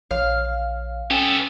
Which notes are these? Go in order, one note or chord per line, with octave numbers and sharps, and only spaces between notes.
A#1 C#5 F5
B3 C#4 A4 G5 G#5